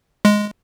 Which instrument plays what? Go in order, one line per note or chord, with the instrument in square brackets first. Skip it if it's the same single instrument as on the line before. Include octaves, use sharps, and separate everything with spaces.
[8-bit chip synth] G#3